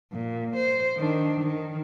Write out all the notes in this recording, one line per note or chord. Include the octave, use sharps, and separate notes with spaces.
A#2
C5
D#3 D4
D#3